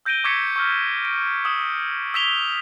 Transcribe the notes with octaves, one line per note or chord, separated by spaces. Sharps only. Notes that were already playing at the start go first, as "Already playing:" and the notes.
E6 G6 A#6 D7 D#7 G7
C#6 D6 E6 G#6 B6 C#7
C#6 E6 F6
D7
D#6 E6 E7
E6 G#6 B6 E7 F7 G7